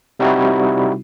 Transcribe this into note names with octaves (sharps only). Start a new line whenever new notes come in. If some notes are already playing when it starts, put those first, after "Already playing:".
C3 G3 C4 D#4 E4 F#4